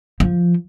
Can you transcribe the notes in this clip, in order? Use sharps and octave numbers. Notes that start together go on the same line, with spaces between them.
F3